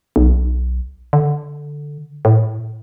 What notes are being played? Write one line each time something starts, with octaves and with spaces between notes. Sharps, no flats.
B1
D3
A2